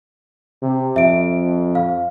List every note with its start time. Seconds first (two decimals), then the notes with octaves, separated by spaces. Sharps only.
0.62 C3
0.96 F2 E5 D7
1.75 F5